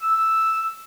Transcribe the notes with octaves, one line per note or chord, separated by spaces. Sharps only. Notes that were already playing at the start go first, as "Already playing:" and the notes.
E6